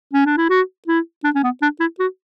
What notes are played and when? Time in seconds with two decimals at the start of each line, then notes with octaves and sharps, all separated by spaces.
0.13 C#4
0.26 D4
0.37 E4
0.50 F#4
0.88 E4
1.24 D4
1.35 C#4
1.44 B3
1.62 D4
1.80 E4
1.99 F#4